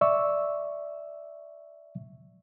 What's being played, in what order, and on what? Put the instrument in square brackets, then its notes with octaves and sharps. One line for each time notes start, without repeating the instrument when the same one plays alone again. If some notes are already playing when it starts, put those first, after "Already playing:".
[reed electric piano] D5 E5 C#6 E6